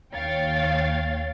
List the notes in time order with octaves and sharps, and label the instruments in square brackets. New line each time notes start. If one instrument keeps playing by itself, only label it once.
[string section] D#2 C#5 F5 G5 A6